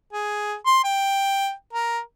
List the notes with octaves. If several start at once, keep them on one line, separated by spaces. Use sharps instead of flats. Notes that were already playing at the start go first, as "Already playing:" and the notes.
G#4
C6
G5
A#4